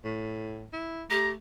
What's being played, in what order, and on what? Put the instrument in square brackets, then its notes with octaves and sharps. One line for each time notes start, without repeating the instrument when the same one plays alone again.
[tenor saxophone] A2
E4
[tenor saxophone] A3 [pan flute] G4 [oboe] A#5